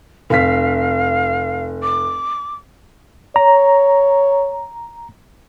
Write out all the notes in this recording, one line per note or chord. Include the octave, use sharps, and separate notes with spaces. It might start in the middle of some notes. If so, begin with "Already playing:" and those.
F1 F5 B6
D6
C#5 A#5